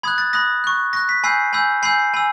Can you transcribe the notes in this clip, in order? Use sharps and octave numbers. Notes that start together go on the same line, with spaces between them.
B5 D#6 F#6 G#6
A6
B5 D#6 F#6 A#6
C#6 F#6
C#6 F#6 A#6
B6
G#5 B5 E6 G6 C7
G#5 B5 E6 G6
G#5 B5 E6 G6 C7
G#5 B5 E6